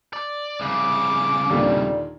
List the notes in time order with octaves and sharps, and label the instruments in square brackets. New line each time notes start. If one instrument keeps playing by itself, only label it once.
[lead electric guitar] D5
[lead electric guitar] C2 C#3 [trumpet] D6
[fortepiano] D#2 A#2 D3 [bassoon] G3